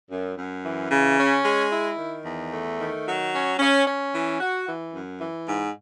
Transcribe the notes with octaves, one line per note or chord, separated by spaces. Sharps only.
F#2
F#2
E3
C#3
C#4
G#3
E4
D#3
E2
A3
D#3
F#3
C#4
C#4
C#4
E3
F#4
E3
F#2
E3
G#2